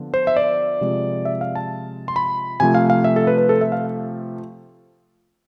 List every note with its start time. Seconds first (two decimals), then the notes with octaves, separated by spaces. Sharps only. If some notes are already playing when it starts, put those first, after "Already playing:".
Already playing: D3 F3 B3
0.14 C5
0.27 E5
0.37 D5
0.81 C3 F3 G#3
1.25 E5
1.41 F5
1.55 A5
2.08 C6
2.16 B5
2.60 C3 F3 A3 G#5
2.75 F5
2.90 F5
3.04 E5
3.16 A4
3.27 B4
3.38 B4
3.49 A4
3.61 E5
3.72 F5